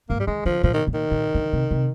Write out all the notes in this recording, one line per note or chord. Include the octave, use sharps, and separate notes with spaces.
G#2 A#3
G3
D#3 G#3
D3 F3
A#2 F3
D#3
A#2
D#3
A#2
D3
C3
C3